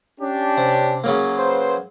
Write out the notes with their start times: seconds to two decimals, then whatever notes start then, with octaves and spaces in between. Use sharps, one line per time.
0.21 C#4 D4 G4
0.57 C3
1.04 C#3 F#3 A#3
1.36 B4 C5